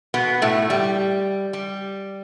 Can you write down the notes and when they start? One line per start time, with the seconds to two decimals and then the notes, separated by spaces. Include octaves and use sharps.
0.14 B2 B3
0.42 A2 A3
0.70 G3
1.53 G3